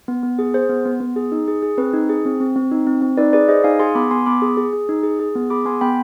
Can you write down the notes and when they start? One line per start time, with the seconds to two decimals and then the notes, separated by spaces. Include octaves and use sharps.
0.08 B3
0.23 B3
0.39 G#4
0.54 G#4 C5
0.69 B3
0.85 B3
1.00 B3
1.16 G#4
1.32 D#4
1.48 G#4
1.62 G#4
1.78 C4 B4
1.93 D#4
2.09 G#4
2.25 C4
2.40 C4
2.56 C4
2.71 D#4
2.87 C4
3.02 C4
3.17 D#4 B4 D5
3.33 G#4 B4 D5
3.48 G#4 C5 D#5
3.64 D#4 F5 G#5
3.79 G#4 G#5 C6
3.95 B3 B5 D6
4.11 B3 G#5 C6
4.26 B3 B5 D6
4.42 G#4
4.57 G#4
4.73 G#4
4.89 D#4
5.03 G#4
5.19 G#4
5.35 B3
5.50 G#4 B5 D6
5.65 B3 G#5 C6
5.81 B3 G5 B5